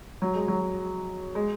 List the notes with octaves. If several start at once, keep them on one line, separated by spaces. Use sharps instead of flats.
F#3
G#3
F#3
G#3